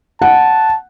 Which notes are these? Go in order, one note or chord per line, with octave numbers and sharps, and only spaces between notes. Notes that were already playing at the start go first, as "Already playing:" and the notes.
F#5 A5